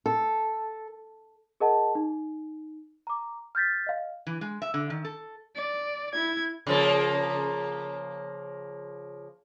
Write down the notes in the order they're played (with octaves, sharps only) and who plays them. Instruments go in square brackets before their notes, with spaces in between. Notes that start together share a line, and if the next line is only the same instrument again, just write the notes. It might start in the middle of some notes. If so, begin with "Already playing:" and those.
[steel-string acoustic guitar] A4
[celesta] G#4 A#4 D#5 F#5 A5
D#4
A#5 D6
F6 G6 A6 B6
D#5 F5
[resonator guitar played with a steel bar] E3
G#3
E5
D3
D#3
A4
[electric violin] D5
E4 G#6
[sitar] C#3 F3 A#3